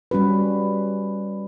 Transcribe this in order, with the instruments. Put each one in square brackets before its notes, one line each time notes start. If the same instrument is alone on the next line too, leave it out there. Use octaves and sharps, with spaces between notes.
[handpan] G3 C#4 F#4 B4